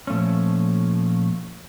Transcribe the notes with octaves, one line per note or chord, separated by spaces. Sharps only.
A#2 F3 A3 C#4